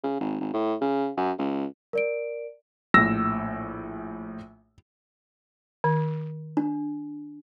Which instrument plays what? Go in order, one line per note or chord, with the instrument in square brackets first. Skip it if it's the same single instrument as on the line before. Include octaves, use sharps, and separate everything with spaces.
[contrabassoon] C#3
G#1
G#1
A2
C#3
F#2
C#2
[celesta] A#4 D5 D7
[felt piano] A#1 A2 [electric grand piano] E6 A#6
[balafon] D#3
[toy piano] D4